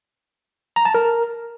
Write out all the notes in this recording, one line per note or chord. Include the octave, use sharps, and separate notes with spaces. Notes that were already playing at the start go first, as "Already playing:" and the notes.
A#5
A5
A#4